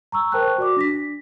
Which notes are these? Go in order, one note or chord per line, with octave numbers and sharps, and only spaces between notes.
A#5 C#6 E6
A#4 C5 G5 A5 C#6 F#6
F#4 D5 D6
D4 A#6 B6